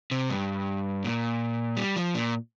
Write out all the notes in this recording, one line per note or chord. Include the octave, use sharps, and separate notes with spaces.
C3
G2
A#2
G3
F3
A#2